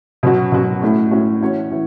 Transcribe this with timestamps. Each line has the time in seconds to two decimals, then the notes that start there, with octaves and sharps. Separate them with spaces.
0.23 B2 F#3 C#4 F#4
0.52 B2 F#3 C#4 F#4
0.82 A2 A3 C#4 F#4
1.11 A2 A3 C#4 F#4
1.41 E3 C#4 F#4 C#5
1.72 E3